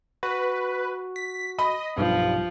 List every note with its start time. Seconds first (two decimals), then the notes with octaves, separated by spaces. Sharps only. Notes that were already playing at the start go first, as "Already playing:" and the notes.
0.23 F#4 B4
1.16 B6
1.59 D#5 B5
1.98 B1 G2 F3